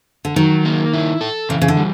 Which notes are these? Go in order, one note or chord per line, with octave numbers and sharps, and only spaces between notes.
D3
D#3 F#3
A#3
E4
A4
C#3 E3
C#3
D3
G3